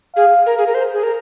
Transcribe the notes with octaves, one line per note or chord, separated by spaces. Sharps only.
G#4 F5
A#4
G#4
A#4
C5
G#4
A#4